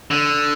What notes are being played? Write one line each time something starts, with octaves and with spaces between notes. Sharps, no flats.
D3